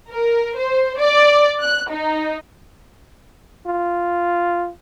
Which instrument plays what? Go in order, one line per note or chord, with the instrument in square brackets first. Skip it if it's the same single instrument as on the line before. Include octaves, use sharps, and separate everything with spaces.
[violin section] A#4
C5
D5
F#6
D#4
[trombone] F4